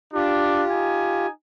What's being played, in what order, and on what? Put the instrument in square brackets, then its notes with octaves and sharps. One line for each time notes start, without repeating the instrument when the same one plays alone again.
[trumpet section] D4 [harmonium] F4 G4
[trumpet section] D#4 G#5